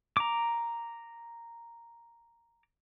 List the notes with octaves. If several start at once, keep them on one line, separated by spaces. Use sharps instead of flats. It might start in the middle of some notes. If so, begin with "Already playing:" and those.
A#5 D6